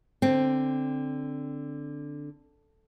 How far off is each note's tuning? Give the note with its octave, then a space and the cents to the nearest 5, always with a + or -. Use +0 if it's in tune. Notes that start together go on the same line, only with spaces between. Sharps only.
D3 +0 C4 +0